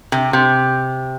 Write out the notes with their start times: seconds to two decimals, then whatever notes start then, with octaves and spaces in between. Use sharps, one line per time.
0.12 C3
0.33 C3